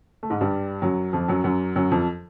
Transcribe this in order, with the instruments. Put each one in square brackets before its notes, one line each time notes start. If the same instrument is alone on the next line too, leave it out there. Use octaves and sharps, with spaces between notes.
[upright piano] A3
G#2 G#3
G2 G3
F#2 F#3
F2 F3
F#2 F#3
F#2 F#3
F#2 F#3
F2 F3